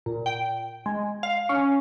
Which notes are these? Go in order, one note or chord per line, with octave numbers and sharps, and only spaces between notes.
A#2
G5
G#3
F5
C#4